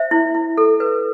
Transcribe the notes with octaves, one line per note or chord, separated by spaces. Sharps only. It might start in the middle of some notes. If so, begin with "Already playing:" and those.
Already playing: C5 E5
E4
E4
A4
B4